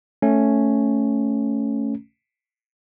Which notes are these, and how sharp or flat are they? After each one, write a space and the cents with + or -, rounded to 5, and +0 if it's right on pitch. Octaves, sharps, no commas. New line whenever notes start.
A3 +0 C#4 +0